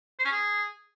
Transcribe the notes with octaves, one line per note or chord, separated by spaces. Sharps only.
C5
C#4
G#4